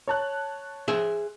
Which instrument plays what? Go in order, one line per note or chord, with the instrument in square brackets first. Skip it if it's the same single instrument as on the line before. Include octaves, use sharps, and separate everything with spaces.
[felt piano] C#5 A5 F#6
[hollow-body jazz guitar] G#4 C5 E5